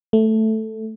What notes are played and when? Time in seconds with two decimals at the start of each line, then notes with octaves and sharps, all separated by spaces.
0.13 A3